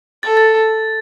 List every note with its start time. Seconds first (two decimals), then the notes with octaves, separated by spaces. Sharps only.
0.23 A4 A6
0.37 A6